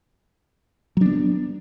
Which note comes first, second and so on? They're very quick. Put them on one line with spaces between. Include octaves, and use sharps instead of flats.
F#3 D4 B3